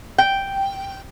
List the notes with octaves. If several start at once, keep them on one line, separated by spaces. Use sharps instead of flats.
G5